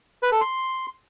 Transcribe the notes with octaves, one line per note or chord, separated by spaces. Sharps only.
B4
A4
C6